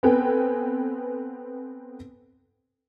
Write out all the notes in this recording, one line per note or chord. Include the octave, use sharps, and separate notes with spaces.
B3 C4 A4 B4 G5 G#5